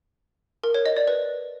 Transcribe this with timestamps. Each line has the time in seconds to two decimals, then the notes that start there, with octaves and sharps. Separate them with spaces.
0.64 A#4
0.75 C#5
0.86 D#5
0.97 D5
1.08 B4